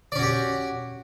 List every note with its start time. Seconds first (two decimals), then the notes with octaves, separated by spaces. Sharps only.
0.12 D5
0.15 C#4
0.19 F#4
0.22 G4